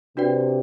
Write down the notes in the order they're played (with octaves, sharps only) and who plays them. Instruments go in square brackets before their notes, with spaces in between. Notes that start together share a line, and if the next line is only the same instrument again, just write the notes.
[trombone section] C3 [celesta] D4 F#4 B4 D5 G5